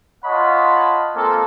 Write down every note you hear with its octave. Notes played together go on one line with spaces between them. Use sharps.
F4 C#5 D#5 F#5 A5 B5
G#3 A#3 C4 F4 A4